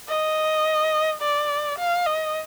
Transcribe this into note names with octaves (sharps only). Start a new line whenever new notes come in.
D#5
D5
F5
D#5